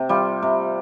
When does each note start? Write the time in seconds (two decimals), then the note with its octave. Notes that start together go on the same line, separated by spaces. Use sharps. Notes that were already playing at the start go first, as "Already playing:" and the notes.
Already playing: C3
0.09 G3 F4
0.42 C3